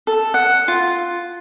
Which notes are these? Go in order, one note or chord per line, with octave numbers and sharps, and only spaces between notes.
A4
F#5
F4